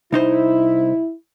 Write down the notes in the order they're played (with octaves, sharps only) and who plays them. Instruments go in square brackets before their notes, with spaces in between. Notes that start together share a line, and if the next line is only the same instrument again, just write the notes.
[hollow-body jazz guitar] C2 D#4 C5 [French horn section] E4